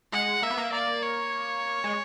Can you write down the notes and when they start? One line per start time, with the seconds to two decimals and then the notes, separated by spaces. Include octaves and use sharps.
0.13 G#3 F#5
0.42 A#3 E5
0.50 B3
0.57 A#3
0.72 A#3 D5
1.02 C#5
1.84 G#3